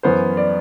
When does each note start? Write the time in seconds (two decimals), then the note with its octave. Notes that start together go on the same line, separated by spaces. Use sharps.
0.03 F#2 E3 B3 C5
0.37 D5